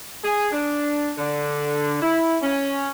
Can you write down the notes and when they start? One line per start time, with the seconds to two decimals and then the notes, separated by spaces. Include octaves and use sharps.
0.23 G#4
0.51 D4
1.18 D3
2.01 E4
2.42 C#4